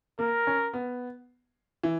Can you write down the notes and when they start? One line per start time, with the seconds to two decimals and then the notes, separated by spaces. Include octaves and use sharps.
0.19 A#3 A#4
0.47 C#4
0.73 B3
1.83 E3